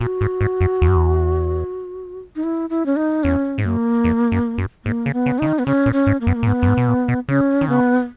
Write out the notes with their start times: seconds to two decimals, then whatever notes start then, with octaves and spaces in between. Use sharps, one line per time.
0.01 A#2 F#4
0.21 G#2
0.41 G#2
0.61 F#2
0.82 E2
0.88 F#2
0.96 E2
2.36 D#4
2.44 E4
2.70 E4
2.86 C#4
2.96 D#4
3.23 E2 C#4
3.58 G#2
3.64 F#2 A#3
4.04 E2
4.32 F#2
4.58 F#2
4.85 G#2 A#3
5.06 C#3
5.13 B3
5.26 C#3
5.39 C#3 D#4
5.47 D#3
5.59 B3
5.66 C#3 C#4
5.86 A#2
5.93 C#4
6.07 G#2
6.21 A#3
6.27 F#2 B3
6.35 A#3
6.43 A#2
6.47 G#2 B3
6.62 F#2
6.68 G#2
6.77 B2
6.88 A#2
7.08 B2
7.29 C#3 C#4
7.61 D#3
7.68 C#3 B3